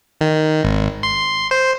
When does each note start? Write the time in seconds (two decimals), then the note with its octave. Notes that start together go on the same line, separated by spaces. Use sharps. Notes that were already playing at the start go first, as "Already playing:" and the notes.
0.21 D#3
0.64 G#1
1.03 C6
1.51 C5